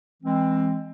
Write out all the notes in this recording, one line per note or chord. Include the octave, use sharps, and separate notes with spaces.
E3 G#3 C4